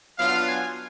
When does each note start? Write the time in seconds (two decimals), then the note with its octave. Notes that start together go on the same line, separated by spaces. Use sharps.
0.18 F#3 B3 D4 F4 F5
0.47 G#5